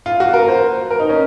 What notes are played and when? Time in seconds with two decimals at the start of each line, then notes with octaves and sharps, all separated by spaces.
0.06 F4
0.20 F#4
0.34 A#4
0.48 C5
0.91 A#4
0.99 D#4
1.09 C#4